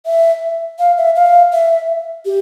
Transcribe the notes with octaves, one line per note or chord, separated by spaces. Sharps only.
E5
F5
E5
F5
E5
G4